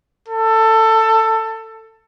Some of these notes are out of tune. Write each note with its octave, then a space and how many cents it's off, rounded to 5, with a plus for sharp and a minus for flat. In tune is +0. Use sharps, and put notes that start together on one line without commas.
A4 +15